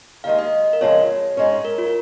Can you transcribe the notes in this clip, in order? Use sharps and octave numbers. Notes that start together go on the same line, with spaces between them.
D#2 D#3 G#3 F5
D#5
A#4
F2 C#3 G#3 C#5
G#2 G#3 C#4
A#4
F4
A#4